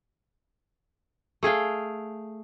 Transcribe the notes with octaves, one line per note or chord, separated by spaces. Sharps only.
A3 G#4 F5 G5